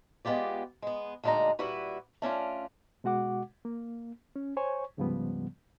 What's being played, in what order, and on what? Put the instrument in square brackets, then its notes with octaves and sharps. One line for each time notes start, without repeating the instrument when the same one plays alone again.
[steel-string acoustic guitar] G#3 B3 F4 G4 D5
G#3 B3
D2 A#2 G#3 D4 D#4 A#5
A#2 G3 E4 F#4 B4
A3 C#4 D4 F4
[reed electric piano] B2 G#3 F#4 F#5 D6
A#3
C#4
C5 C#5 G#5 C#6
D2 G#2 C#3 F3 G3 B3